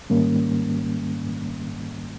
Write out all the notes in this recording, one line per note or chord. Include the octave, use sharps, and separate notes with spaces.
G#2 D#3 G3 A#3 C#4